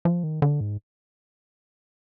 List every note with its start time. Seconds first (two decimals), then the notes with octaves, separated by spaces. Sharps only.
0.05 F3
0.24 D#3
0.42 D3
0.60 G#2